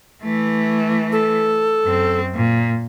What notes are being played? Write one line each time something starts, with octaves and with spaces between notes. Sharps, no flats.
E3 A3
A4
F#2 C4
A#2